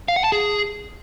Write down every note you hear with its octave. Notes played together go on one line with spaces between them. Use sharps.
F5
F#5
A5
G#4